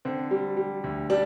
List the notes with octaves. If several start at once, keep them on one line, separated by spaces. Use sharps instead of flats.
D3 C4
G3
G3
D2
G3 D4